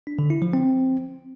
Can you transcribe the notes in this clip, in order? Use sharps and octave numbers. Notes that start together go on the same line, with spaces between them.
D4
D3
E4
F3
C4